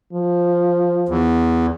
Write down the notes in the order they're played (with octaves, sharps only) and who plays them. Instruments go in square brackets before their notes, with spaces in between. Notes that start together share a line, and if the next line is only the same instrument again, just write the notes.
[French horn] F3
[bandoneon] E2